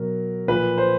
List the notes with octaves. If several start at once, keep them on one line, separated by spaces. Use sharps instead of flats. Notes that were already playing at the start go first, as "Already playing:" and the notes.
Already playing: B2 F#3 A#4
A#2 F3 B4
C5